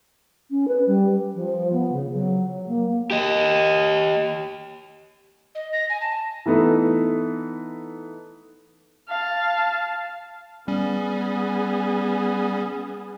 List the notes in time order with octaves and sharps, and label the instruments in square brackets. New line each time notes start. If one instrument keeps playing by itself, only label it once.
[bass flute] C#4
B4
G3
F3
B3
C#3
F#3
A#3
[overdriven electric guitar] G4 D#5
[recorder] D#5
A#6
G#5
A5
[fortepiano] E3 A3 B3 D#4
[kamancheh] F5 A5
[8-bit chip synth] G3 C#4 [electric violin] B3 G#4